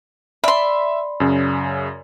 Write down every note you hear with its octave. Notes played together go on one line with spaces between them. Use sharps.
D5 E5 B5 C6
F#2 C#3